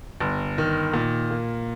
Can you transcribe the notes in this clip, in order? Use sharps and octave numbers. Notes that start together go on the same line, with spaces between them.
G1
D#3
A#2
A#3